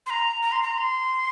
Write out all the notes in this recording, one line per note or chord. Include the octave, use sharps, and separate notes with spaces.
C6
A#5
A#5
C6
A#5
C6